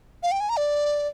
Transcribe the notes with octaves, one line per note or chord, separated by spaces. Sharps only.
F5
G5
G#5
A#5
D5